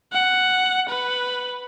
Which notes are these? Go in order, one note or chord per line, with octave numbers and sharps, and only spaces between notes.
F#5
B4